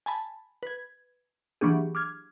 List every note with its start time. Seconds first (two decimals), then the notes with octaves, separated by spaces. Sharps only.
0.06 G#5 A5 B5
0.63 B4 G#6
1.61 E3 F#3 A#3 D4 G4 G#4
1.95 D6 F6 G#6